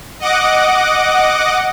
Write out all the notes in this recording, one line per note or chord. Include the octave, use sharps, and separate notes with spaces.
D#5 F#5 D6